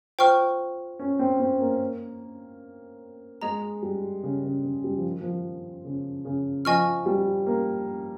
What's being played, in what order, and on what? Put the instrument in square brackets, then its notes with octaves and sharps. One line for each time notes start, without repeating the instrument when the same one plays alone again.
[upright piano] F4 [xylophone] C5 G5 C#6 F6
[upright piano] C#4
C4
C4
A#3
[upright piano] G#3 [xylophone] G#4 D#5 A#5
[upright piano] G3
C#3
C#3
C#3
G3
F3
D#3
F3
C#3
C#3
[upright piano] F3 [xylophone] D#5 G#5 C#6 F6
[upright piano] G3
A#3